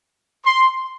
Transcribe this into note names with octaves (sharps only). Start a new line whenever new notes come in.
C6